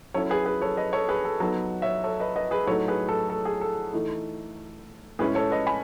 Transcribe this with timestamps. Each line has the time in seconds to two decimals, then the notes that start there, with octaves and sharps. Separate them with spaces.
0.14 F#3 C#4 E4 A4 C#5
0.30 G#4 B4
0.45 G#4 B4
0.62 A4 C#5
0.77 B4 D#5
0.93 A4 C#5
1.09 G#4 B4
1.25 A4
1.40 F#3 B3 D#4 A4
1.82 C#5 E5
2.04 A4 C#5
2.20 B4 D#5
2.36 B4 D#5
2.51 G#4 B4
2.67 A2 F#3 A3 D#4 A4 C#5
2.88 G#4 B4
3.09 A4
3.30 A4
3.45 G#4
3.61 A4
3.93 E3 A3 D#4
5.19 A2 G#3 C#4 E4 G#4 B4
5.35 A4 C#5
5.51 B4 D#5
5.67 G#5 B5